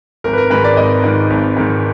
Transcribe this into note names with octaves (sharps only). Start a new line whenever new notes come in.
G#1 A#4
B4
A#4
G#2 D#3 B4
D5
G#1 D#5
G#2 D#3
G#1
G#2 D#3